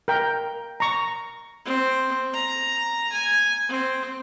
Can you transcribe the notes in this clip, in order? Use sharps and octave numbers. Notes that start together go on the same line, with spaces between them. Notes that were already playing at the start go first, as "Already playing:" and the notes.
A#4 G5
A#5 C#6
C4
A#5
G#5
C4